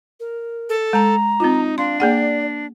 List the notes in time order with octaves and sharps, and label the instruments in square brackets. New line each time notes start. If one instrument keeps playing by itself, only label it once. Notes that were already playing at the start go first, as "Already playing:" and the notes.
[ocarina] A#4
[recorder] A4
[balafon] G#3 A5 [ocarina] A#5
[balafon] C4 F4 [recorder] D#4
[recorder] D4 [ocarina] F5 [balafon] C6
[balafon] A#3 G#4 F#5 [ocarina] D5